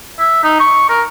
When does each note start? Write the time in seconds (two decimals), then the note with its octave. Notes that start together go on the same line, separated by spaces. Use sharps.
0.19 E5
0.44 D#4
0.60 C#6
0.89 A#4